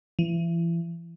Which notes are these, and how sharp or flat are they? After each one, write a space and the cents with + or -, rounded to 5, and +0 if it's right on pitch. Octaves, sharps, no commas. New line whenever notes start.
E3 +35